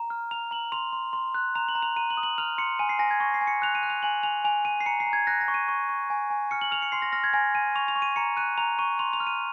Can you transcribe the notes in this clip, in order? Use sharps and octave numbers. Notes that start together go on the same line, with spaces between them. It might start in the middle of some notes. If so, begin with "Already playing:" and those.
Already playing: A#5
F6
A#5 F7
A#5 F#7
C6 F7
C6
C6
F#6
A#5 F7
F#7
A#5
F7
A#5 D#7
F#7
D#6
F#7
F6 F7
C6 C#7
G#5 D#7
C7
G#5 A#6
G#6
C#6 A#6
C7
G#5
C#7
F#6 F7
D#7
F#6
F7
G#5 F#7
G#5 F7
G#5 F7
G#5 D#7
C7
A#5 C#7
C7
A#5
G#6
F#6 A#6
A#6
C#6
D#7
C#6
C#6
G#5
G#5
F6 C#7
F#7
F6 F7
C#7
C6 C7
A#6
F6 A#6
G#6
G#5 A#6
G#5 D#7
C#6 F7
F7
C#6
D#7
A#5 C#7
F#6 D#7
A#5 F7
C#6 D#7
C6 F7
F7
F6
D#7